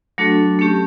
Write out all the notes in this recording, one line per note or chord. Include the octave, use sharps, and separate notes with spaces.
F#3 A3 D4 F#4 A4
A3 C#4 G4